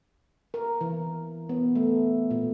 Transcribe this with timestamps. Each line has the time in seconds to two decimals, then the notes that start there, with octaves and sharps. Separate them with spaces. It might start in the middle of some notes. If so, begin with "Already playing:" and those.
0.54 A#4
0.81 E3
1.49 B3
1.76 A3
2.30 A#2